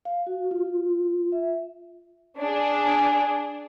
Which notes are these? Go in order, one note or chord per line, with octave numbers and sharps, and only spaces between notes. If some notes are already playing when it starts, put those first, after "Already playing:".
F5
F#4
F4
E5
D4 G#4